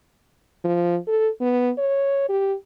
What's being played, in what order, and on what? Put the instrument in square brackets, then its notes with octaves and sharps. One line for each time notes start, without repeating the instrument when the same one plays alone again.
[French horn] F3
A4
B3
C#5
G4